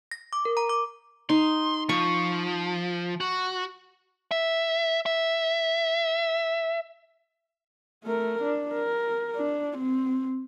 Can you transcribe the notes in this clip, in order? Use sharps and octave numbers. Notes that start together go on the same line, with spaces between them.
A#6
D6
A#4
A#5
D6
D#4 C6
F3 C#6
F#4
E5
E5
A3 A#4
D4
A#4
D4
C4